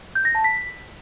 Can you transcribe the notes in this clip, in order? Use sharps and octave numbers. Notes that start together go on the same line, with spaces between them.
G6
A#6
A5
B6